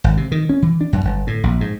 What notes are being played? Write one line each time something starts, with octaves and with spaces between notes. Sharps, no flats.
G#1
C3
D#3
C#4
E3
D4
F#2
G1
A2
A#1
G#2